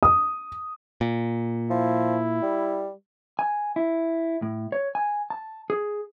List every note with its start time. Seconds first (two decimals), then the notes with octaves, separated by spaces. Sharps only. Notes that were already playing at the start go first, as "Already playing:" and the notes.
0.03 D#6
1.01 A#2
1.70 F3 E4
2.43 G3
3.39 G#5
3.76 E4
4.42 A2
4.72 C#5
4.95 G#5
5.30 A5
5.70 G#4